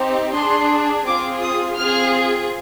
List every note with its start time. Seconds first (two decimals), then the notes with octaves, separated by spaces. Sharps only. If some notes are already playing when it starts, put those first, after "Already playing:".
Already playing: C4 D#4 G4
0.35 D4 G#4 C6
1.06 C4 F4 G#4 D6
1.42 D#6
1.77 C4 F4 G#4 F6